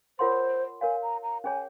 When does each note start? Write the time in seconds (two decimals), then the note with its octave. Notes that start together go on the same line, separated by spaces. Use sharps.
0.19 F4 A#4 C5 C#5 F#5 C6
0.81 A#4 C#5 F5 G#5
1.03 A#5
1.23 A#5
1.44 C#4 G#4 C#5 G#5